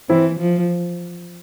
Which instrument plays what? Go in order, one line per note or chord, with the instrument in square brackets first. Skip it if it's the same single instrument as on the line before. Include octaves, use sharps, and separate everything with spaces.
[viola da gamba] E3 [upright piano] C4 E4
[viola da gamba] F3